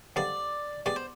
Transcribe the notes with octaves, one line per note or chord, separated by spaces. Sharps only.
G2 D3 F3 C4 D#4 D5
B2 G#3 B3 D4 G4 D5
C5